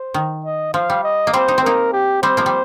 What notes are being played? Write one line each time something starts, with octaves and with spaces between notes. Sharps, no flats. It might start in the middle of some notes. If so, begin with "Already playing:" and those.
Already playing: C5
D#3
D#5
F3 F5
G3
D#5
A#3
G3 C4 C5
D#4
C4
A#3 D#4 A#4
G4
G3 C4 C5
F3 A#3
G3